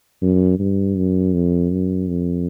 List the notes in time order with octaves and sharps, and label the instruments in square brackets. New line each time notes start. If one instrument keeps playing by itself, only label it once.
[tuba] F#2
G2
F#2
F2
F#2
F2